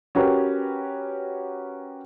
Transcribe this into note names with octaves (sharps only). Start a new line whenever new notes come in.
C#4 F#4 G4 A#4 B4